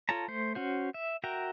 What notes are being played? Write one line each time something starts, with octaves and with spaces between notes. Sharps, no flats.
F4 A4 C#5 A5 A#5
A3 C5
C#4 F#4 C5
E5
F#4 A#4 E5 G5 A#5